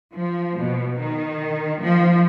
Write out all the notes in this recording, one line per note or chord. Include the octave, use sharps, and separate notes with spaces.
F3
B2
D#3
F3